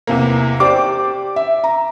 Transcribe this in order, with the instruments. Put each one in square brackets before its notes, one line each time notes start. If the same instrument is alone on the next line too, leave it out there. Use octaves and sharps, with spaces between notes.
[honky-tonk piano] E2 C3 A#3
[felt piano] G4 C5 D5 [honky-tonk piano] D6
[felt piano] E5
A#5